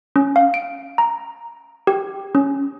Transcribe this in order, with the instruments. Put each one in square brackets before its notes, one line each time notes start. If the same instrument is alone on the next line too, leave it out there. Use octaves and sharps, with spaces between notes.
[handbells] C#4
F5
D7
A#5
G4
C#4